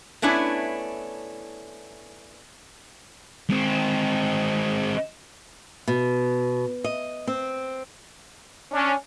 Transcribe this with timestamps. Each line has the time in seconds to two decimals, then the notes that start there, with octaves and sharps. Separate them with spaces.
0.22 A3 B3 C#4 D4 E4
3.50 G#3 C4
5.88 B2
6.84 D#5
7.27 C4
8.72 C#4 D4